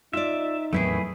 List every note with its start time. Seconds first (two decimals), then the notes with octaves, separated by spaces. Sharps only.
0.13 D#4 F4 D5 E5
0.73 E2 A2 D#3 F#3 A3 C4 E4 G#4